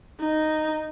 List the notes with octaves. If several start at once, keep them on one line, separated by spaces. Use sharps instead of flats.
D#4